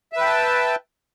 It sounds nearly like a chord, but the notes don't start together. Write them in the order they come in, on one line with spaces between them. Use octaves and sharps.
E5 B4 G5 A5